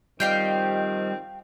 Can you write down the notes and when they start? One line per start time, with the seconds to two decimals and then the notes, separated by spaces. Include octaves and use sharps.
0.20 D#3 F3 G3 C4 G4 D#5 F5 G5